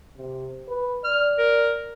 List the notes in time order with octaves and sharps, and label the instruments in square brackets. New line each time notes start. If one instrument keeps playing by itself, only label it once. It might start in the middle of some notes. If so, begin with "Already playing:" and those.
[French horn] C3
B4
[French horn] D5 [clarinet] F6
[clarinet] A#4